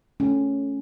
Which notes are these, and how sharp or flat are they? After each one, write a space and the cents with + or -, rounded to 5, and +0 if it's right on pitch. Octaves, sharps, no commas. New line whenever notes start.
A3 -10 C#4 +0